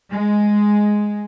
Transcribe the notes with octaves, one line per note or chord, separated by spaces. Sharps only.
G#3